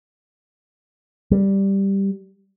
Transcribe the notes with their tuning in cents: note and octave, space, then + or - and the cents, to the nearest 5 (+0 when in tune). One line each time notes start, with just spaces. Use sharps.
G3 +0